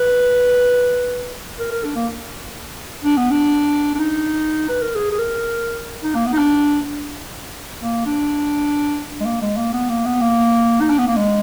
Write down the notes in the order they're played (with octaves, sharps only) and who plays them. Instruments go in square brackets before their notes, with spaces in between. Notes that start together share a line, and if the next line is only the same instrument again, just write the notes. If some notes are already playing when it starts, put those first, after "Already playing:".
Already playing: [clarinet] B4
A#4
A#4
D4
A#3
D4
B3
D4
D4
D#4
B4
A#4
G#4
G#4
A#4
D#4
A#3
B3
D#4
D4
A#3
D4
G#3
A#3
G#3
A#3
B3
A#3
B3
A#3
D#4
D4
B3
A#3
G#3